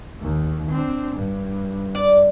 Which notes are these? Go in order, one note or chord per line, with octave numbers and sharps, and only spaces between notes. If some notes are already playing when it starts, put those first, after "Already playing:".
D#2
C4 D4
G2
D5